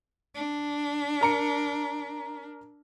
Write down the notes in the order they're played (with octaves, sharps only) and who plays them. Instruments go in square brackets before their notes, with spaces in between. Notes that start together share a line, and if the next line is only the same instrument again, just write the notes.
[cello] D4
[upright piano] A#4 A#5 C#7